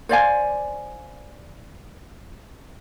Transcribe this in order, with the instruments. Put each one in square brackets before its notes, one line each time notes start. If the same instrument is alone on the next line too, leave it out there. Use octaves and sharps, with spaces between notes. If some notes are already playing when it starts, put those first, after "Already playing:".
[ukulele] C5 D5 F5 G#5